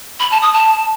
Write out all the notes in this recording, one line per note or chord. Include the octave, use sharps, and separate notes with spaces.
B5
A5
D#6
A5